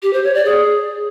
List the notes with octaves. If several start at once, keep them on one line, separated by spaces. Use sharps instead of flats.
G4
C5
C#5
D5
G#4